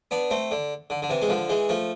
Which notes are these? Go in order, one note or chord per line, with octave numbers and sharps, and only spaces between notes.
B3 D4
A3 C4
D3
D3
D3
C3 E3
G#3
D3 F3
E3 G#3
F3 A3